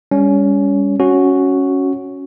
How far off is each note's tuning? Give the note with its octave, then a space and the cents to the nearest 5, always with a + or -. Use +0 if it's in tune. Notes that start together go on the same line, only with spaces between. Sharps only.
G3 +40 C#4 +20
C#4 +0 F#4 +0